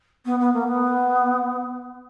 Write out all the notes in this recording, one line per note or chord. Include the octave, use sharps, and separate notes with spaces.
B3
B3
A#3
B3